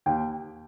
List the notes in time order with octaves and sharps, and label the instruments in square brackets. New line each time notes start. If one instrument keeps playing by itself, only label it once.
[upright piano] D#2 G5